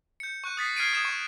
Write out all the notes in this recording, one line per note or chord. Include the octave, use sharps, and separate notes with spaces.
G6 C#7
C#6 F#6 D#7
D#6 A6 B6 C7
F6 G#6 C7 D7 D#7
D#6 G#6 C#7 D7 E7
C#6